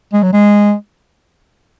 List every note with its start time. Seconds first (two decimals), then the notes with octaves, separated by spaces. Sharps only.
0.13 G#3
0.23 F#3
0.33 G#3